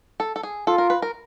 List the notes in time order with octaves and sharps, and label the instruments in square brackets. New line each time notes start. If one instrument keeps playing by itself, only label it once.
[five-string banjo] A4
A4
G#4
[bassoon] F4 [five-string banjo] A4
[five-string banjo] A#4
B4
A#4